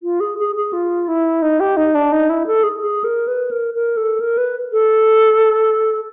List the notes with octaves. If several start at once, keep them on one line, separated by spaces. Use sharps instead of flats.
F4
G#4
G#4
G#4
F4
E4
D#4
G4
D#4
D4
D#4
E4
A4
G#4
G#4
A#4
B4
A#4
A#4
A4
A#4
B4
A4